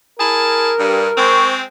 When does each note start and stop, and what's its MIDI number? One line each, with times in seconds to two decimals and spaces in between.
0.19 0.72 64
0.19 0.72 68
0.19 1.51 70
0.19 0.72 81
0.79 1.09 43
1.17 1.63 56
1.17 1.63 60
1.17 1.55 85